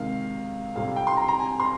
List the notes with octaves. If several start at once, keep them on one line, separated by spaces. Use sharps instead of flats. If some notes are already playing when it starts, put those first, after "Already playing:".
Already playing: C3 D#3 G#3 F5
F2 C3 G3 F5
G5
C6
A#5
A#5
G#5
C6